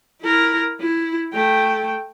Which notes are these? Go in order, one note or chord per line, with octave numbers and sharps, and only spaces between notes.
E4 A#4
E4
A3 G5